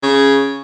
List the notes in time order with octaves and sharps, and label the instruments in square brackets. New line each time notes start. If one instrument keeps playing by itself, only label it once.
[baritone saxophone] C#3